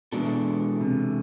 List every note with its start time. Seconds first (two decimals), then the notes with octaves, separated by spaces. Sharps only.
0.12 B2 E3 G#3 D4 A4
0.80 C3